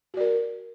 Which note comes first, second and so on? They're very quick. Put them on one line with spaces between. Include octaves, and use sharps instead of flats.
F#4 D5 A#4